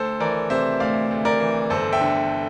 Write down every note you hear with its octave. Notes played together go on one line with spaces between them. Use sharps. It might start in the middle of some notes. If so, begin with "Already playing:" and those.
Already playing: D2 A4 C5
E3 A#4 D5
C3 C5 E5
D2 D5 F5
D2
A#4 D5
E3
G1 A4 C5
E5 G5
D3